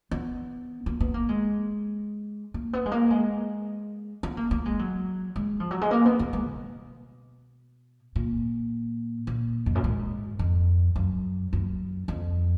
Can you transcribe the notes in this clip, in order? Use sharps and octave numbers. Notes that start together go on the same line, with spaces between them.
B3
A#3
B3
A#3
G#3
A#3
B3
G#3
A#3
G#3
B3
A#3
A#3
G#3
F#3
G#3
F3
F#3
G#3
A#3
B3
A#3
G#3
B2
A#2
A#2
F2
F#2
G#2
F2
F#2
F#2
F2